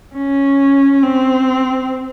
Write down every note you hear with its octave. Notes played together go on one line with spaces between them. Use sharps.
C#4
C4